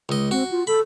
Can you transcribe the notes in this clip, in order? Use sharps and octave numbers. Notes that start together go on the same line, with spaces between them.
C#2 D#5
C4 F#4
F4
A4 B5